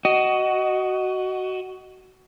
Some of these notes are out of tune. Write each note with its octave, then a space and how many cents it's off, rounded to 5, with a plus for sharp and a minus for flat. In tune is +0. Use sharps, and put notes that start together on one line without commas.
F#4 +15 D#5 +0